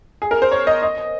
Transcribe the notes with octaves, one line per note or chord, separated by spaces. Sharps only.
G#4
A#4
C5
C#5
D#5
D#5